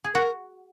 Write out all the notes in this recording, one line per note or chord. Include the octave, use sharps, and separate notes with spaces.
G#4
F#4 A#4